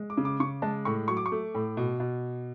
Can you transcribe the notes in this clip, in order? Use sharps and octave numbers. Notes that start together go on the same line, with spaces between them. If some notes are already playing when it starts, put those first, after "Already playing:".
Already playing: G#3
D6
C#3
D6
C#3 C#6
G#3 A5
A2 C#6
F#3 C#6
D6
C#6
A3
A2
B2
B2